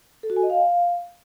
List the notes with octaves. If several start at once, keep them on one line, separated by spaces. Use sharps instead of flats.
A4
F#4
G#5
D#5
F5